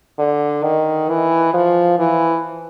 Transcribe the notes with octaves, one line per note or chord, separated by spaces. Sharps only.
D3
D#3
E3
F3
E3